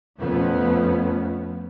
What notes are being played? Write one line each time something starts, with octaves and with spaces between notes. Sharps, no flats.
F2 F3 A3 B3 C#4